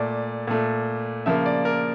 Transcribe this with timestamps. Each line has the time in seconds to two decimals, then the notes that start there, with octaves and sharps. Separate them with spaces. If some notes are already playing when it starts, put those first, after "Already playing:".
Already playing: A#2 A3 D5
0.47 A#2 A3
1.26 C#3 F3 A#3 E5
1.46 D5
1.65 A#4